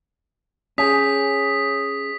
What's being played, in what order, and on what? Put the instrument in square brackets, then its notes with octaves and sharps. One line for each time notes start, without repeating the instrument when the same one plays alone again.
[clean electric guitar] C#4 [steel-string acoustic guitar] G4 G#4 [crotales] D#6 B6